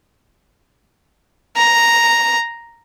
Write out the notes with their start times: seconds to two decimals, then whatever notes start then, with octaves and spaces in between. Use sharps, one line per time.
1.57 A#5